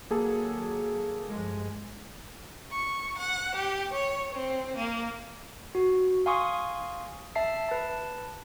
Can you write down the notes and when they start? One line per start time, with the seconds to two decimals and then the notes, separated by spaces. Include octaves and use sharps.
0.10 D#2 F#3 A#3 G#4 A4
1.28 G2 F3 G#3
2.71 C#6
3.18 F#5
3.55 G4
3.92 C#5
4.34 C4
4.77 A#3
5.75 F#4
6.26 F5 G#5 C6 C#6 D#6
7.35 E5 A5 C7
7.69 B4 A5